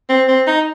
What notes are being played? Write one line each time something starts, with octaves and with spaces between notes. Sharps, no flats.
C4
C4
D#4